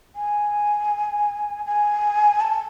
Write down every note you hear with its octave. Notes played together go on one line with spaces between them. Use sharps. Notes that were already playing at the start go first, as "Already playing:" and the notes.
G#5
G#5
A5